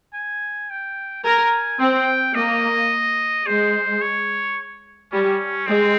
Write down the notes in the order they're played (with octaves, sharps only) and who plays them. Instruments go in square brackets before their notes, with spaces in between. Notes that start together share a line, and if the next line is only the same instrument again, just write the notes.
[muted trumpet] G#5
G5
[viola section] A#4 [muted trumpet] G#5
[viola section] C4 [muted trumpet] G5
[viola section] A#3 [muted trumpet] D#5
[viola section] G#3 [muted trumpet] C5
[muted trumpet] C#5
[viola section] G3 [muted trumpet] C#4
[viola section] G#3 [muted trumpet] C4